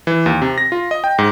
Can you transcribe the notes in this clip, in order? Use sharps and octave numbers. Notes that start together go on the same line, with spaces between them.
E3
D#2
C3
A#6
F4
D#5
G5
G#2